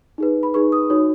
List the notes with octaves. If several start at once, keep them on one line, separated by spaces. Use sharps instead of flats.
D#4 G#4 B4
B5
D#4 G#4 B4 C#6
D#6
D#4 F#4 C#5